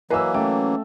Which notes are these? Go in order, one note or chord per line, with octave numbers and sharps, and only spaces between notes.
E3 F#3 A#3 B4 D#5 F5 G#5 E6
A3 C#4 G5